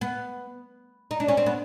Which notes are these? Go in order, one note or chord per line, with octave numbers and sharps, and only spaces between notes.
B3
D#4
D4
C#4
C4
B3